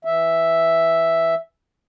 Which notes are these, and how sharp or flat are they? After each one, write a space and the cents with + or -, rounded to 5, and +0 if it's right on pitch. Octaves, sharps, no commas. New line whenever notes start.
E3 +0 E5 +0